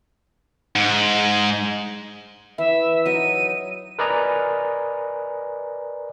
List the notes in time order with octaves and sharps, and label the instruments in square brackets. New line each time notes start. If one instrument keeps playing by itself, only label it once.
[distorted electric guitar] G#2
[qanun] E3 [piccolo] E5
[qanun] F#3 D#4 [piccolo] D#7
[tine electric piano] A#4 B4 D5 D#5 G#5 A#5